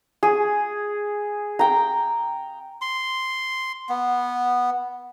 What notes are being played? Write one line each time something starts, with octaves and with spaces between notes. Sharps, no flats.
G#4
G5 A#5
C6
B3